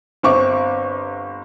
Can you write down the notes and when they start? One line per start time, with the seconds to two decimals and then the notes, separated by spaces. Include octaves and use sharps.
0.23 G1 C4 C#6 D6